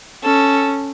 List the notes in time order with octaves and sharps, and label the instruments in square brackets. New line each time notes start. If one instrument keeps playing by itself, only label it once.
[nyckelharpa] C#4 [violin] A4